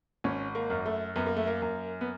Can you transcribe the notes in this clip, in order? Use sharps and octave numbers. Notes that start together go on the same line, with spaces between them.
G#1 C#4
A#3
F#2
A3
F#2 B3
A#3
A3
A#3
F#2
B3